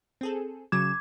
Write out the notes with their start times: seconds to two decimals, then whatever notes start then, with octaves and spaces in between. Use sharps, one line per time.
0.21 C4 G#4 A4
0.72 C#3 F#3 D6 G#6 E7